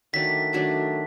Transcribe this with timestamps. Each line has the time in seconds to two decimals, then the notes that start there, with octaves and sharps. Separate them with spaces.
0.13 D#3 F#3 A3 D4 B6
0.53 D#3 F#3 A3 D4